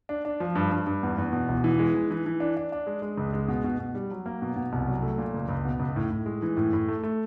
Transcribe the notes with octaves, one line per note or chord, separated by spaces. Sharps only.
D4
D4
F3
G2
G2
G2
E2
E2
B2
E1
E3
G#3
E3
E3
E3
D4
D4
D4
G#3
G#3
C#2
G#3
B2
B2
B2
G3
F#3
A#3
B2
B2
C2
F#3
A3
A#2
C#2
C#2
B2
C#2
A2
A2
G#3
E3
A2
A2
A3
A3